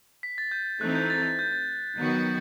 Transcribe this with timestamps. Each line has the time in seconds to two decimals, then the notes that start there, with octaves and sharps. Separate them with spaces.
0.23 B6
0.38 A6
0.52 G6
0.81 E3 A3 C4 D#4 F#6
0.95 G6
1.10 A6
1.39 G6
1.52 A6
1.96 D#3 F#3 B3 F#4